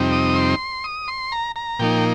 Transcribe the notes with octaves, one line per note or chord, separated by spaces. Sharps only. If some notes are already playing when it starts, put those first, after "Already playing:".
Already playing: F2 C3 G3 C4 D#4
D#6
C6
D#6
C6
A#5
A#5
A#2 F3 A#3 D#4 G5